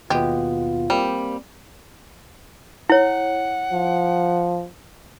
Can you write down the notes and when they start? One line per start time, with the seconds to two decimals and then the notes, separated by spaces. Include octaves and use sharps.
0.10 D#2 B2 G#3 B3 F4 G4
0.90 G3 A#3 C4
2.90 E4 C#5 F#5
3.73 F3